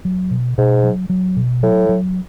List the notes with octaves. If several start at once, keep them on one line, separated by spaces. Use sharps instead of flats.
F#3
B2
G#2 B2
F#3
F#3
B2
A2 F#3
F#3